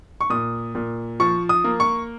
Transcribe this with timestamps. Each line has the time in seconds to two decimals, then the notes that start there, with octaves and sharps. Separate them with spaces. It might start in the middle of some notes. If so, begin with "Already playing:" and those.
0.21 C#6
0.30 A#2 D#6
0.75 A#2
1.20 F3 C#6
1.49 D#6
1.64 A#3
1.80 C#6